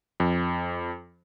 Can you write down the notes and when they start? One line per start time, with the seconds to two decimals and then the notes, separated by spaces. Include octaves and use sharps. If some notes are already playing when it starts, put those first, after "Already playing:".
0.20 F2